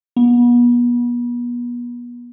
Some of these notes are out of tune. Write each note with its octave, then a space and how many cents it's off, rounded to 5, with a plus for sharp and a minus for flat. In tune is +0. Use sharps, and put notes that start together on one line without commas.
B3 -35